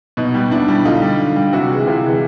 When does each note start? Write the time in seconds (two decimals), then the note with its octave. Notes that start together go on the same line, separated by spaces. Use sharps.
0.17 B2 D#4
0.34 G3
0.51 B2 D4 E4
0.68 G3
0.85 D3 D#4 F4
1.02 G3
1.19 D3
1.36 G3
1.53 C3 E4 F#4
1.70 E3 G#3
1.87 C3 F4 G4
2.05 E3 G#3